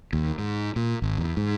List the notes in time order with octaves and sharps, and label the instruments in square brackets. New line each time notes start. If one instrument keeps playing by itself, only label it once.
[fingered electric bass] D#2
G#2
A#2
G#1
E2
G#2